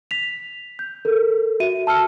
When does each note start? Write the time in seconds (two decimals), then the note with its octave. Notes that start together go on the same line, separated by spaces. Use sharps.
0.11 B6 F7
0.79 G6
1.05 A4 A#4
1.60 F#4 E5 D#7
1.87 A5 E6 F6 C#7